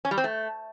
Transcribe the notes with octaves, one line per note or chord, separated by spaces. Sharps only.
C#4
G3
C4
A3